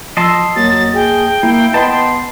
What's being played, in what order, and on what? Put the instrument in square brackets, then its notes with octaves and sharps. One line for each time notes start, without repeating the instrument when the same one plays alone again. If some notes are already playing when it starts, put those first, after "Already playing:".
[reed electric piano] F3 E6 [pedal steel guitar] D#5 A5 C6
[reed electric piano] F2 A#3 [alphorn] F#3 [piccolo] A6
[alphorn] G#4 [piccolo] G5
[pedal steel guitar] A#3 [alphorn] E4
[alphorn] B3 [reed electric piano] B4 D#5 B5 [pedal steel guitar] A5 C6